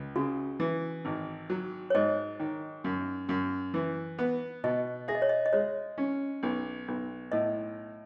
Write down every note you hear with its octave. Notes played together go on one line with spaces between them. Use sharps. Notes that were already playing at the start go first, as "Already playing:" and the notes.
Already playing: C#2
C#3 F#4
E3
G#1
F#3
C#5
G#2 D#5
D#3
F#2
F#2
E3
B3
B2 D#5
G#4 E5
D#5
C#5
D#5
D#5
G#3 C#5
C#4
B1
B1
A2 D#5